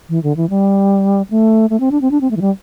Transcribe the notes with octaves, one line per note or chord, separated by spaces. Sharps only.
E3
D3
E3
G3
A3
A3
C4
D4
C4
D4
C4
A3
E3
G3